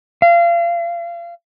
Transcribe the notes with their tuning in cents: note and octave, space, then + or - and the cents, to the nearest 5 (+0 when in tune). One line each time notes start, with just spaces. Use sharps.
F5 -30